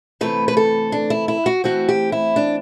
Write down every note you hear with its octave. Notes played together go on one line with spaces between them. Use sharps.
C3 E3 A3 C4 B4
B4
A4
D4
E4
E4
F#4
E3 A3 C4 F#4
G4
E4
D4